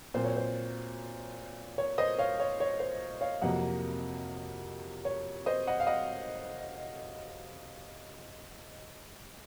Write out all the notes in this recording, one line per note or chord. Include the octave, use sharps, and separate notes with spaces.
A#2 F#3 C4 C5
C#5
C5
C#5
C5 D#5
C#5 F5
C#5
C#5
C5
C#5 F5
F2 C3 F#3 A#3 D#5 F#5
C#5
C5 D#5
D#5 F#5
F5
D#5 F#5